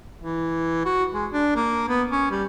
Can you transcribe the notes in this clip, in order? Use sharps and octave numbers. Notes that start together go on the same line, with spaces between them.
E3
F#4
G#3
D4
A#3
B3
C#4
G3